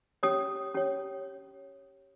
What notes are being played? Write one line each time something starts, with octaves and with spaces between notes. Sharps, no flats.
C#4 G4 C#5 D#6
C#4 G4 C#5